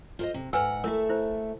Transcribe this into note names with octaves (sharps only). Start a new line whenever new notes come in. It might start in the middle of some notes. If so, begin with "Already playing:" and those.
F4 C5 D#5
C3
G#2 B4 F#5 G#5 E6
A3 E4 A#4 E5
E4 C5